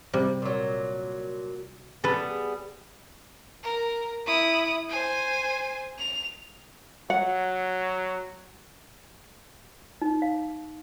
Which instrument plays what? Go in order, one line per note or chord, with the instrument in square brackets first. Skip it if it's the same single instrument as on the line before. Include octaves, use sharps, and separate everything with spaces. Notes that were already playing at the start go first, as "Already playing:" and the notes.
[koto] C3 G3
[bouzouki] A#2 F#3
[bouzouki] G3 B3 G#4 [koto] A4 B4
[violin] A#4
E4 D#6
C5 G#5
F7
[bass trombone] F#3 [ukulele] F#5
[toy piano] D#4
F5